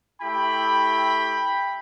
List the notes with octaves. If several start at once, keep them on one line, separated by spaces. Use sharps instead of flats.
A3 E4 G4 G5 B5